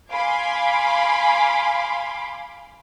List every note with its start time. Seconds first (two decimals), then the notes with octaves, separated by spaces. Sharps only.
0.11 F5 G#5 B5 C6 D6